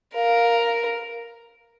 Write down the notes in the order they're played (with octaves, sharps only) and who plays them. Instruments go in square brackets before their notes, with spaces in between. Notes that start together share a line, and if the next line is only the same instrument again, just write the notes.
[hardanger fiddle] A#4 [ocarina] F5